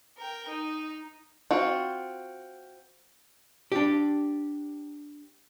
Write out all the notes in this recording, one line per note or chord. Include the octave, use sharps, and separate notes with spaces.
A#4 G5
D#4
C4 F4 F#4
D4 G4